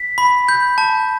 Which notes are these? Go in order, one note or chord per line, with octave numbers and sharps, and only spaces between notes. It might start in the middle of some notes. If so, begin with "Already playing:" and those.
Already playing: B6
B5
G6
A5